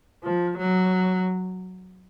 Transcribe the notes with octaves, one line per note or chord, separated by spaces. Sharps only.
F3
F#3